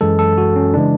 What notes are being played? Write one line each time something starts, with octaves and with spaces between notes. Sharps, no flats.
F#2 E3 G#3 A4
A4
F#4
C#4
C#3 E3 G#3 D4